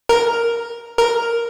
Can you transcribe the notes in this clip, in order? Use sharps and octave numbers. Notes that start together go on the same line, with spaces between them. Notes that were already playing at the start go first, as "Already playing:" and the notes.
A#4
A#4